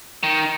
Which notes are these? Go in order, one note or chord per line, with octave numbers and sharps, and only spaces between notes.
D#3